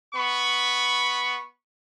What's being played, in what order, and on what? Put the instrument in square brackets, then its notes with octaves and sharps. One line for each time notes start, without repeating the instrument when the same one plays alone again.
[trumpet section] B3 B5 C#6